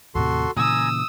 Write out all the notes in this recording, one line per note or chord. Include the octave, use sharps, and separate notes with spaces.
D#2 A2 C3 F#4 A4 C6
A#2 C#3 E3 G#5 A#5 D#6 E6